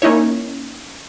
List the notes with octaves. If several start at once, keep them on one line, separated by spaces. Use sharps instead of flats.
A#3 C#4 D#4 E4 C#5